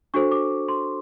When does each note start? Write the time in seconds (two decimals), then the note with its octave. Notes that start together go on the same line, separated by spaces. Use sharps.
0.14 D4 F#4 A4 C5 C#6
0.32 D6
0.68 C6